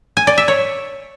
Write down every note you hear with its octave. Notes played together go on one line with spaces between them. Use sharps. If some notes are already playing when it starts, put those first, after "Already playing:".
G#5
D5
E5
C#5